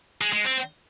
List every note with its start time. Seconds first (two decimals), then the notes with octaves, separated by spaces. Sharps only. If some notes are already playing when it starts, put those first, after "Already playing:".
0.21 G#3
0.33 G#3
0.44 C4